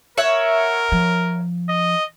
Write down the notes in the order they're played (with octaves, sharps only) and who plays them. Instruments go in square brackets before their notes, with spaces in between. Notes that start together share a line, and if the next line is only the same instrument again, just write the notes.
[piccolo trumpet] A#4 [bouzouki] C#5 E5 F#5
[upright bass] F3
[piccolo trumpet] D#5